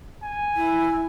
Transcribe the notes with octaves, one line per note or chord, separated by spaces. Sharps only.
G#5
E4